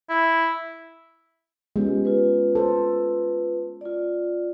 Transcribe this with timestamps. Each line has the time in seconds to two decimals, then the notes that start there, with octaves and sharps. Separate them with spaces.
0.09 E4
1.76 G#3 B3 C#4 F4 G4
2.05 F4 B4
2.55 A4 C5
3.81 F4 D5